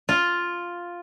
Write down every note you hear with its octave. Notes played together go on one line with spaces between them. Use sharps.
F4